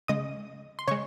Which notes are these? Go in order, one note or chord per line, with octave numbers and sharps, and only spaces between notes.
C#3 G#3 D#5 D#6
C6
C#3 G#3 C#5 C#6